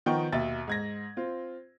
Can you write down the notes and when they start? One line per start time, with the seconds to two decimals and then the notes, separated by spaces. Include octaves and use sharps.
0.06 D#3 F3 B3 D#4 G5 C#6
0.32 D#2 B2 E5 A6
0.67 G#2 G#6 A#6
1.17 C4 F4